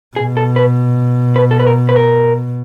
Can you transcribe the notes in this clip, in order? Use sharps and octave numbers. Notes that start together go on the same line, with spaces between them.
B2 G#4
A4
B4
B4
A4
B4
A#4
B4
A#4